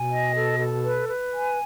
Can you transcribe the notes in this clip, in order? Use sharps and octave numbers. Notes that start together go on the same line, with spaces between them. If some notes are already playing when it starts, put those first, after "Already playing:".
Already playing: B2 G#5
D#5
A4
A4
B4
B4
G#5